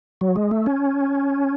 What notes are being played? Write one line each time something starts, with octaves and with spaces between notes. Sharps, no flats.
F#3
G#3
A3
C#4